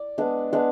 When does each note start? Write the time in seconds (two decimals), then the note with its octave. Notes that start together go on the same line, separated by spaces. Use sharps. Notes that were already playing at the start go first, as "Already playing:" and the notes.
Already playing: D5
0.18 G#3 B3 D4
0.53 G#3 B3 D4